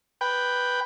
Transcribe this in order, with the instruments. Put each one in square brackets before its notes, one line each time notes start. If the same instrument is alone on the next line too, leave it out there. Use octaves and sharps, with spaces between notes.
[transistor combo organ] B4 G5